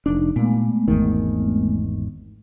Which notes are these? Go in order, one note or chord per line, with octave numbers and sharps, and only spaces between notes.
F1 D4 D#4
A#2 G#3 A3 B3
G#1 E2 D#3